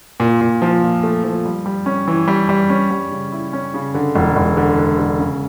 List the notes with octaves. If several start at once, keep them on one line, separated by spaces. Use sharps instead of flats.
A#2
A#2
F3
A#2
A3
F3
G3
G3
C#4
E3
G3
G3
C#4
G3
C#3
E4
C#4
C#3
D3
E1
E1
D3
D3
D3
C#3